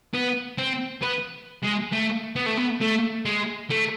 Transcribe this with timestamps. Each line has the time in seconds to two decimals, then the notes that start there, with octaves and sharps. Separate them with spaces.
0.14 B3
0.58 C4
1.02 B3
1.63 G#3
1.92 A3
2.36 B3
2.46 A3
2.57 B3
2.81 A3
3.25 G#3
3.70 A3